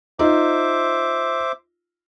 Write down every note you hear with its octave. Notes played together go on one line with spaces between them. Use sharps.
D#4 F4 C5 E5 D6